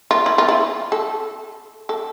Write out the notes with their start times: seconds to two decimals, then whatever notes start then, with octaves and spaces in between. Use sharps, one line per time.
0.11 F4
0.26 E4
0.38 F4
0.48 E4
0.92 A4
1.89 A4